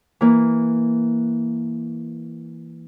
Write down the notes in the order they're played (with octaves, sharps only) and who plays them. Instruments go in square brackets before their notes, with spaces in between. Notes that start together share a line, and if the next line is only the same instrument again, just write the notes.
[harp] E3 A#3